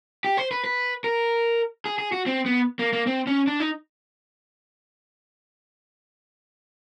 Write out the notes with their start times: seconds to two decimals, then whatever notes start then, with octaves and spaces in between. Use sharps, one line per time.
0.24 G4
0.37 C5
0.51 B4
0.64 B4
1.04 A#4
1.85 G#4
1.99 G#4
2.12 F#4
2.26 C4
2.46 B3
2.79 A#3
2.93 A#3
3.07 C4
3.27 C#4
3.47 D4
3.60 D#4